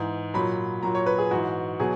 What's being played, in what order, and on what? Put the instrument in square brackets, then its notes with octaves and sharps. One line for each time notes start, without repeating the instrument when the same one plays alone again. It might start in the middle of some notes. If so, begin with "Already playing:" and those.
Already playing: [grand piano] G#2 E3
A#2 F#3 B5
A#2 F#3 A#5
C#5
B4
G#4
G#2 E3 F#4
B2 F#3 G#4